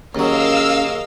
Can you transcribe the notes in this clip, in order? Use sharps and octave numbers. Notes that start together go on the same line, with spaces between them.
D#2 F#3 C#4 G#4 A#4 D#5 F5 E6